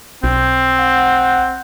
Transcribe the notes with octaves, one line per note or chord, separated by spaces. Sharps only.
B1 C4
F#5